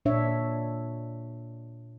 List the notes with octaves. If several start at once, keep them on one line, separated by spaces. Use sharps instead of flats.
A#2 D4 C#5 E5